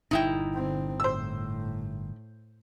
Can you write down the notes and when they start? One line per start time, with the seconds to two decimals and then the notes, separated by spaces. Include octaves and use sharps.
0.11 G1 A#2 D#4 E4 G5
0.54 D3 C4
1.00 A2 C5 E6